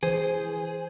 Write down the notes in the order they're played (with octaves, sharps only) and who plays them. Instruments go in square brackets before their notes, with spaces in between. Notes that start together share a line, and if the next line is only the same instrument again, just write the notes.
[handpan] E3 [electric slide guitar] G#4 [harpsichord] C5